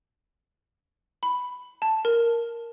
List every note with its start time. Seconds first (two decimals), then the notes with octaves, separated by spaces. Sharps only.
1.23 B5
1.82 A5
2.05 A#4